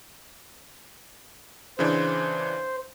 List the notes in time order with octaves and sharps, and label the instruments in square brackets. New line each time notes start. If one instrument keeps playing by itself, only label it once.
[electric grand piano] C#3 E3 D4 [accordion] C5